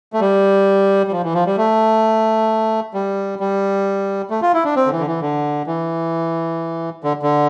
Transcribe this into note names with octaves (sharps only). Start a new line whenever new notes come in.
A3
G3
G3
F3
E3
F3
G3
A3
G3
G3
A3
F4
E4
D4
C4
D3
E3
D3
E3
D3
E3
D3
D3